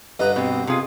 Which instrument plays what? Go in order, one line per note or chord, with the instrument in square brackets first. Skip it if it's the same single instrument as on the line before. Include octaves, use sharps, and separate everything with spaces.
[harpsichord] G2 D3 A#5 [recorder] B4 [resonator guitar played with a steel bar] D#5
[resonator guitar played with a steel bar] B2 [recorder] C4
[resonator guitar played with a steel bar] C3 F4 [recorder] G#4